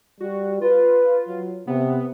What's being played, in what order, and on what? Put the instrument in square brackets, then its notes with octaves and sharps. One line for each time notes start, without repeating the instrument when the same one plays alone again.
[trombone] G3 [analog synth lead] F#4
[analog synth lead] F4 [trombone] B4
[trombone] F#3
[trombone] C3 [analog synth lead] B3